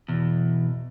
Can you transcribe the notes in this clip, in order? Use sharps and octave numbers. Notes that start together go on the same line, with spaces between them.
E2 B2